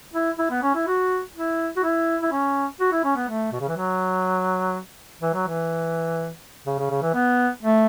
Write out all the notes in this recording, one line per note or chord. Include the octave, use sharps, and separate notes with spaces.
E4
E4
B3
C#4
E4
F#4
E4
F#4
E4
E4
C#4
F#4
E4
C#4
B3
A3
B2
C#3
E3
F#3
E3
F#3
E3
C#3
C#3
C#3
E3
B3
A3